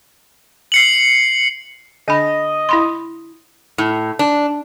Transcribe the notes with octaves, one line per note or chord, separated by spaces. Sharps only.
C7 C#7 F#7
D3 D4 D#5 B5
E4 B5 C6
A2
D4